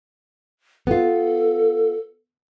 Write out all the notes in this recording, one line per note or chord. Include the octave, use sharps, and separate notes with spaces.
B3 F4 A4